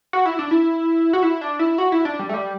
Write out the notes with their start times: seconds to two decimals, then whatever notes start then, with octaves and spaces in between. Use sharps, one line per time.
0.13 F#4
0.26 E4
0.39 D4
0.51 E4
1.13 F#4
1.23 E4
1.41 D4
1.59 E4
1.78 F#4
1.92 E4
2.05 D4
2.19 G3
2.29 A3
2.34 G3